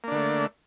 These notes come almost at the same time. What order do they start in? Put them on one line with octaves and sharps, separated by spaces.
A#3 D4 D3 A3